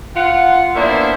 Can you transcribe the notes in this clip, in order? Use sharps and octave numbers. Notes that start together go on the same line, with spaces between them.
F4 F#5
A#3 B3 D4 E4 C5 E5